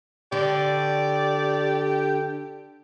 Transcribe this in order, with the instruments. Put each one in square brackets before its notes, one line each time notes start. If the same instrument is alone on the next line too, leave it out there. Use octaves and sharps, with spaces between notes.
[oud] D3 [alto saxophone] G4 [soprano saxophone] D5